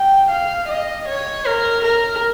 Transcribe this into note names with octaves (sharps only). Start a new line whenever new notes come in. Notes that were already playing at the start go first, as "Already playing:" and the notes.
Already playing: G5
F5
D#5
C#5
A#4
A#4